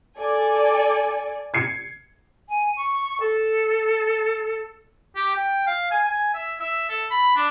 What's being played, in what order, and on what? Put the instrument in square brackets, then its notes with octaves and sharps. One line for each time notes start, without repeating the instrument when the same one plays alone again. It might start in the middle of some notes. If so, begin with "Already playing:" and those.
[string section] A4 D5 G#5
[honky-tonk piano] G#6 C7 C#7
[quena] G#5
C#6
A4
[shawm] G4
G5
F5
G#5
G#5
E5
E5
A4
B5
D4